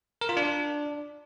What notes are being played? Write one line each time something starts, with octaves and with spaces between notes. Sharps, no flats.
A#4
F4
D4